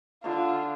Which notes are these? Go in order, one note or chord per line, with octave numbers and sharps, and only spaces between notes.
D3 F4